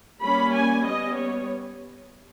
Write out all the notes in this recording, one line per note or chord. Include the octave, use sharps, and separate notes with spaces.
G3 A#3 C#4 B5
G#5
G3 B3 D#5
C#5